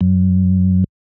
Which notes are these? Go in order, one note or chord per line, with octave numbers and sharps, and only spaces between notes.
F#2